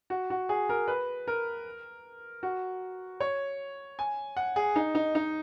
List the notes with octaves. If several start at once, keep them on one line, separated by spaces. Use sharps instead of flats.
F#4
F#4
G#4
A#4
B4
A#4
F#4
C#5
G#5
F#5
G#4
D#4
D#4
D#4